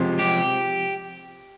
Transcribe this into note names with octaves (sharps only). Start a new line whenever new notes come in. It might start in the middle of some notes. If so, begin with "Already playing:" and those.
Already playing: C3 F3 G#3
G4